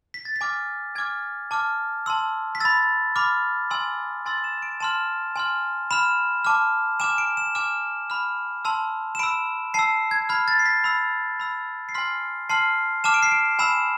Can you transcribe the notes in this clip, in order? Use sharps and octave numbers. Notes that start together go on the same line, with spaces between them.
B6
A6
B6
G#5 D6 F6
G#5 D6 F6 G#6
A5 D6 F6
A5 C6 E6
B6
B5 E6 A6
B5 D6 F6
G#5 C6 E6
G#5 C6 E6 A6
E7
D7
A5 C6 F6 E7
G#5 C6 F6
B5 F6 E7
A5 D6 F6
G#5 D6 F6 E7
D7
E7
G#5 D6 F6 E7
B5 F6
A5 C6 E6 F7
E7
B5 E6 D7
A5 E6 C7
G#6
B5 F6 G#6
A6
C7
B6
B5 E6
B5 E6
C7
G#5 C6 F6 B6
A5 C6 F6 C7
A5 D6 F6 E7
D7
C7
D7
G#5 B5 E6 E7